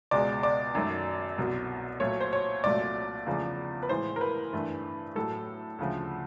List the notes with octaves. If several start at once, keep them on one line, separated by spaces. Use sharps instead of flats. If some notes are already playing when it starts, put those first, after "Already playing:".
C#2 B2 G#3 D5
D5
F#2 D#3 F#3 A3
C2 B2 F#3
A#2 F#3 A3 C#5
C5
C#5
C2 A#2 F#3 A3 D5
E2 C#3 F3 A3
B4
A2 E3 G#3 C5
A#4
B4
G2 E3 A3
A2 F#3 A3 A4
D2 C#3 F3 A3